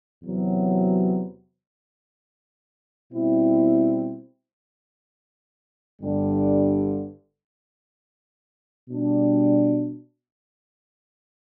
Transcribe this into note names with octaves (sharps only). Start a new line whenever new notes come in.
E2 C3 F#3 B3
B2 G3 C4 E4
G1 G2 D3 G3 D4
B2 G3 D4